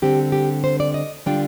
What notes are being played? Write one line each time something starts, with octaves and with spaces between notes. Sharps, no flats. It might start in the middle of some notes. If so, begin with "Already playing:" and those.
D3 G3 C4 G4
G4
C5
D5
D#5
D3 G3 D4 F4 G5